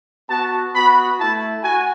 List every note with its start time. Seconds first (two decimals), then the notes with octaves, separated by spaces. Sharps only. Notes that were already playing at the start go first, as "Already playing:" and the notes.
0.29 B3 F#4 A5
0.74 B3 F#4 B5
1.19 A3 E4 A5
1.63 F#4 G#5